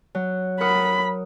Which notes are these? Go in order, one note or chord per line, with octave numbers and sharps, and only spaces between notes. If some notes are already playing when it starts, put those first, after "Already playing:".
F#3
A#4 F#5 B5 D#6